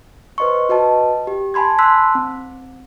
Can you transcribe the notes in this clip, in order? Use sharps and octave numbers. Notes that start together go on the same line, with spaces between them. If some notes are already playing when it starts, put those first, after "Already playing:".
B4 C5 D#5 C6 C#6
F#4 B4 D#5 A5
G4
G#5 A5 B5 C6 G#6
A5 C6 E6 F#6 B6
C4